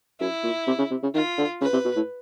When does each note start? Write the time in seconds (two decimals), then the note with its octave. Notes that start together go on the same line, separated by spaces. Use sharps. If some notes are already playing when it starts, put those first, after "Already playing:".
0.20 F#2 E4
0.44 A#2
0.67 C3
0.78 C#3
0.91 C3
1.03 C#3
1.14 D#3 F4
1.38 D3
1.61 C#3 B4
1.73 C3
1.85 B2
1.96 A2